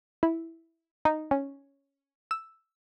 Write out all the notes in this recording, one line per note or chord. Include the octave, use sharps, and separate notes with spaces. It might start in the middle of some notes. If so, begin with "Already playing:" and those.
E4
D#4
C#4
E6